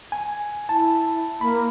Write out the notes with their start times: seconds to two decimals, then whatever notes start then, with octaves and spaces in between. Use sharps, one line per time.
0.12 G#5
0.69 E4 A5
1.41 A#3 B5